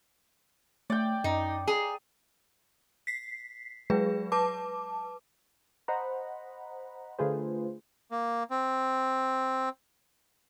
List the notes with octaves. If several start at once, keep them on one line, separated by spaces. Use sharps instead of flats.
A3 D5 G5
F#2 D#4
G#4 A#5
B6 C7
F#3 G#3 G#4 B4
B4 A5 D6
C5 D#5 F#5 A#5 B5
D3 A3 F4 G#4 B4 C5
A#3
C4